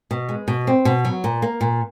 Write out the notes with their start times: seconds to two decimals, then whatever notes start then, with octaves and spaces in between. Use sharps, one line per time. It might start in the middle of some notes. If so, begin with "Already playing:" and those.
0.11 B2
0.29 G#3
0.48 B2
0.67 C4
0.85 B2
1.05 F#3
1.24 A#2
1.42 A#3
1.61 A#2